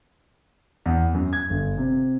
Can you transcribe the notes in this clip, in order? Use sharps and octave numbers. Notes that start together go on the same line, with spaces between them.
E2
F#2
G#6
G1
C3